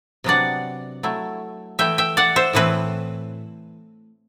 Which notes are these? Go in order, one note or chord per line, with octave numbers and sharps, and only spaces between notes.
C3 F#3 B3 D4 D5 F#5
F#3 A3 E4
E3 A3 E4 E5 G5
E5 G5
D5 F#5
C5 E5
A2 E3 A3 C4 E4 B4